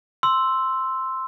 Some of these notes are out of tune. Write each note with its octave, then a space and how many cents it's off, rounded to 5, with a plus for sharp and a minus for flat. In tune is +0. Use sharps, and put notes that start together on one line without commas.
C6 +0 E6 +0